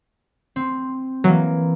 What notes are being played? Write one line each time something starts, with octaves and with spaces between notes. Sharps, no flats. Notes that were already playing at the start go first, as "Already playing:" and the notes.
C4
E3 F#3 A#3